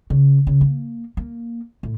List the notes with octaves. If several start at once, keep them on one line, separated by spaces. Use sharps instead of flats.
C#3
C#3
A#3
A#3
A2